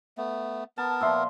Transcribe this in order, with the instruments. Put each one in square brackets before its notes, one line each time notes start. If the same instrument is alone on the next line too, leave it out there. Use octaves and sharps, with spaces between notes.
[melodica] A3 B3
[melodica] B3 A#4 [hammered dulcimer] A5
[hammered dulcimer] A#2 F3 C6 [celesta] E5 E6